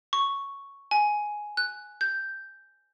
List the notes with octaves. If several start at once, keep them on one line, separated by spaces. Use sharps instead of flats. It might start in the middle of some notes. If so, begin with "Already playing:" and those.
C#6
G#5
F#6
G6